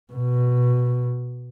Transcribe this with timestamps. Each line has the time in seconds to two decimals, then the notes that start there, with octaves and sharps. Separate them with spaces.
0.13 B2